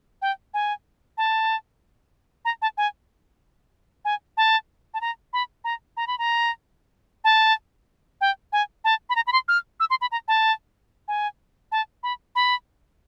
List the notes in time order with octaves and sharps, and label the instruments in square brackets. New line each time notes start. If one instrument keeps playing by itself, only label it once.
[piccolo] G5
G#5
A5
A#5
A5
G#5
G#5
A5
A5
A#5
B5
A#5
A#5
B5
A#5
A5
G5
G#5
A5
B5
A#5
B5
C6
F6
E6
C6
B5
A#5
A5
G#5
A5
B5
B5